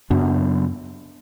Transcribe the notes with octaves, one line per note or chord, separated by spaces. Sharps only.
F#2 C#3 F#3 B3 D4